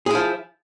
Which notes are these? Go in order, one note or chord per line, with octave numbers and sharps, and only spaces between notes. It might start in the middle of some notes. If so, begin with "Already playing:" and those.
F3 E4 G#4